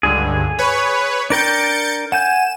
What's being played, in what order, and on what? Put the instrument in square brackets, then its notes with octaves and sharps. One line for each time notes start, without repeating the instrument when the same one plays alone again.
[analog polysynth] C#2 G2 D3 [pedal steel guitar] G#4
[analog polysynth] B4 C#5
[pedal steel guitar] D4 A#4 G5 [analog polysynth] G6 A6 C#7
[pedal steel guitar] F#5 G#5 G6 [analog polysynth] E7